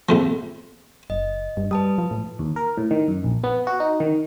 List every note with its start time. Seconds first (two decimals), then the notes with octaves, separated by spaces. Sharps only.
0.09 A#1 F2 F3
1.10 F#1 D#5
1.57 G2
1.71 G3 B4 A5 D#6
1.98 F3
2.11 A2
2.39 D#2
2.56 A#4
2.77 A2
2.91 D#3
3.08 F#2
3.24 A#1
3.44 B3
3.67 F#4
3.80 D#4
4.00 D#3